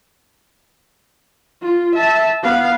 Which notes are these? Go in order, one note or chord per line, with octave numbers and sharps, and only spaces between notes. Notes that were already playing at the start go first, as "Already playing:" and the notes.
F4
E5 A5
B3 F5